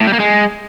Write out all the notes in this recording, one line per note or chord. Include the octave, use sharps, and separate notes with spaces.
A2
G3
A#3
G#3